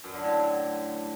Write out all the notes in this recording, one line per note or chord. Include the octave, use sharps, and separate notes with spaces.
F#2
D3
A2